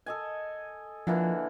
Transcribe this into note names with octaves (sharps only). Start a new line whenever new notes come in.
A4 D#5 G#5
D3 E3 F3 A#3